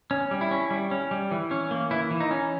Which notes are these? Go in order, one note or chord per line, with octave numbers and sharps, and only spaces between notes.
C#4
G3
E4
C#4
G3
C#4
G3
E3
C#4
A#3
E3 E4
E3
D#4
C#4